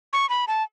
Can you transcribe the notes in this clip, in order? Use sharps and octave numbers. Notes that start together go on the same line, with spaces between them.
C#6
B5
A5